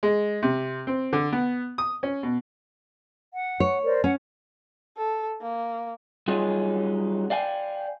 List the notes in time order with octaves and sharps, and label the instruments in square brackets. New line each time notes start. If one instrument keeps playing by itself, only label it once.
[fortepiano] G#3
C3
C4
D3
B3
D#6
C#4
B2
[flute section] F#5
[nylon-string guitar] C#5
[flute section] A#4 C5 D5
[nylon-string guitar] C#4 [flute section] F#5
[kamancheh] A4
A#3
[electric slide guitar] F#3 G3 C#4 D#4 F4 G#4
D5 F5 G5 G#5